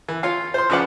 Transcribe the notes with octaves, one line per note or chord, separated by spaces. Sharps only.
E3
F4 C#5 F5
C5 C6
C#3 F3 B4 D5 F#5